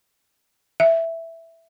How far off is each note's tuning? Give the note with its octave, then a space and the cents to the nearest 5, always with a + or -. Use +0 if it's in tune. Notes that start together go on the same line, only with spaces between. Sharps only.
E5 +0